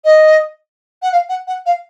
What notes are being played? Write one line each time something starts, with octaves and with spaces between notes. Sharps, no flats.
D#5
F#5
F5
F#5
F#5
F5